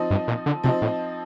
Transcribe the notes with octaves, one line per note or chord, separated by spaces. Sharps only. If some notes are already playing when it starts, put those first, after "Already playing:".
Already playing: F3 C4 D#4
G2
A#2
D3
C3 F3 C4 D#4
A2